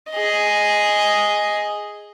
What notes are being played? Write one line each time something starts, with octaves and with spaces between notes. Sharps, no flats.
G#4 D#5